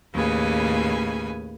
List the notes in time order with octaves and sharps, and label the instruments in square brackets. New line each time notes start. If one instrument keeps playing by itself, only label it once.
[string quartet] D#2 A2 C#3 B4 G#5